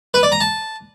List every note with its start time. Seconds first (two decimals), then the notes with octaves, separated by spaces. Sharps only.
0.14 B4
0.23 D5
0.32 A#5
0.41 A5